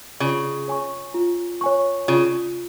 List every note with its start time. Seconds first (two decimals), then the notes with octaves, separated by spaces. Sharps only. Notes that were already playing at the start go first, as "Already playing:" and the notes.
0.20 C#3 F4
0.68 C#5 G#5 C#6
1.14 F4
1.61 C#5 G#5 C#6
2.08 C#3 F4